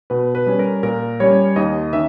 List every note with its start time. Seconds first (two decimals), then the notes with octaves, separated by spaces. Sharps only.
0.10 B2 B4
0.35 B4
0.46 G3 C#4
0.59 A#4
0.83 A#2 A#4
1.20 G3 C#4 C#5
1.56 D#2 D#5
1.93 D#3 C#4 E5